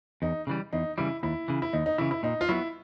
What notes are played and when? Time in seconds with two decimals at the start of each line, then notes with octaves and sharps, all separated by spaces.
0.22 E2 D#4
0.47 C#3 E3 G3
0.73 E2 D#4
0.98 C#3 E3 G3 E4
1.23 D#2 E4
1.48 C#3 E3
1.62 E4
1.73 D#2 D#4
1.86 D#4
1.98 C#3 E3 E4
2.11 E4
2.23 A#2 D#4
2.41 F4
2.49 F#3 B3 E4